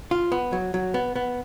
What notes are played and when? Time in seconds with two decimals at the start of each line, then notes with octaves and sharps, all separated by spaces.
0.11 F4
0.32 B3
0.53 F#3
0.74 F#3
0.94 B3
1.16 B3